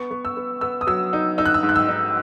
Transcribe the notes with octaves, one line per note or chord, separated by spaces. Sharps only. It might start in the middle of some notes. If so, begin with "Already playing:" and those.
Already playing: B3 C#6
B3
E6
B3
B3 E6
D#6
F#3 E6
D#4
D#4 E6
F#6
E6
G#2
F#6
E6
D#4